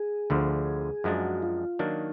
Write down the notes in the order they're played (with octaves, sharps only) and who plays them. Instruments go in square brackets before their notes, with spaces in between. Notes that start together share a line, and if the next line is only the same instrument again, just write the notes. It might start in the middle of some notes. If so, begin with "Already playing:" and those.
Already playing: [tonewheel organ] G#4
[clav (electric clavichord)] D2 D3 F3
[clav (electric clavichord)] F#2 F3 G#3 D4 [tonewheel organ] F#4
[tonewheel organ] F4
[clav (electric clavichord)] D#3 F#3 A#3 D4 [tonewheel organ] D#4